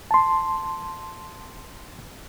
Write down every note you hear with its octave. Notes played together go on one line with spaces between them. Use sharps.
A5 C6